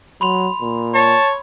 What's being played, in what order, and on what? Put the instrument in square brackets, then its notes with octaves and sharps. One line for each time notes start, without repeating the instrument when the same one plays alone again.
[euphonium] F#3 [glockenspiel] B5 C6 F7
[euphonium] A#2
[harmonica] C#5 [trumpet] A5